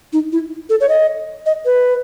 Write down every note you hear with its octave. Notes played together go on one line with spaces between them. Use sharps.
D#4
E4
A4
C#5
D#5
D#5
B4